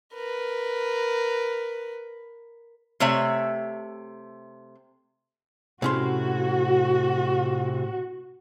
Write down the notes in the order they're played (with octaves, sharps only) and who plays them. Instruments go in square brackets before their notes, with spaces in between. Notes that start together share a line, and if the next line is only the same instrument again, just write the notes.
[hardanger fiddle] A#4 B4
[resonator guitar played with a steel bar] C3 A3 C#5 E5
[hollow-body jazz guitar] A2 C#4 C6 [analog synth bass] C3 [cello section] F#4